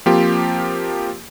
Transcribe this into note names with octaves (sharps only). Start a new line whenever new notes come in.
F3 A#3 C4 F4 G4